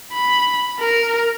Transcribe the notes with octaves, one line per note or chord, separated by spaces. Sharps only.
B5
A#4